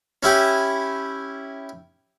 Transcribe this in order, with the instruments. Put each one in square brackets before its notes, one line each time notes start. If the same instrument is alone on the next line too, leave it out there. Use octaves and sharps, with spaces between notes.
[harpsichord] C#4 E4 G4